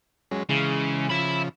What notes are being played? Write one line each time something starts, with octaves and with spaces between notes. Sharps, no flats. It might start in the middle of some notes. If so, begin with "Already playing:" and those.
F#3 G#3 C#4
C#3 E3 G#3
C#3 F3 E5 B5